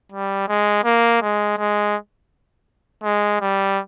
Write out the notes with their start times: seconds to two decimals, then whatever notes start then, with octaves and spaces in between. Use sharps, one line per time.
0.12 G3
0.48 G#3
0.84 A#3
1.22 G#3
1.58 G#3
3.04 G#3
3.41 G3